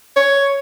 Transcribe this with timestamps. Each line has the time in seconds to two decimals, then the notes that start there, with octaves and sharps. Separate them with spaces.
0.16 C#5